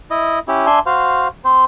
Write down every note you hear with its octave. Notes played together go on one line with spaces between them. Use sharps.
E4 D#5
C#4 E4 G4
D4 E5 G#5 C6
F#4 C5 F5
C4 C5